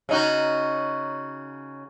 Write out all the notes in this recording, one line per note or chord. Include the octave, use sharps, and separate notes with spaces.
C#3 D#4 F#4